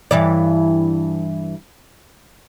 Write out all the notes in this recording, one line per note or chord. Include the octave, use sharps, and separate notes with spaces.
G2 E3 D5